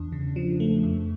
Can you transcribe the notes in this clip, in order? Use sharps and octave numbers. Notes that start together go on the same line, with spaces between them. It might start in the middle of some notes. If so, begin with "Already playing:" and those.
Already playing: E2 D4
C#3
F3
A3
F2